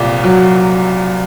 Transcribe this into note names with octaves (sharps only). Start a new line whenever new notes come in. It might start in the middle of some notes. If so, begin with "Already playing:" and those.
Already playing: C2 A#2
F#3